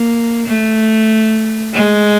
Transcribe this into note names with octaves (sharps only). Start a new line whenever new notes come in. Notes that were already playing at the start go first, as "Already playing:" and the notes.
Already playing: A#3
A3
G#3